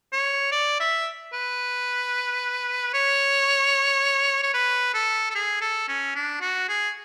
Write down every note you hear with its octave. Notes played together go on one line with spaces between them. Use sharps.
C#5
D5
E5
B4
C#5
C#5
B4
A4
A4
G#4
A4
C#4
D4
F#4
G#4